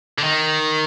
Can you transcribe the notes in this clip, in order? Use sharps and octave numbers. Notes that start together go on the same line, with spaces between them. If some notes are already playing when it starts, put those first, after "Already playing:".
D3
D#3